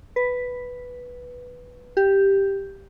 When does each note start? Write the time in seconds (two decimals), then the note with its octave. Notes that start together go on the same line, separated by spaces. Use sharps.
0.16 B4
1.97 G4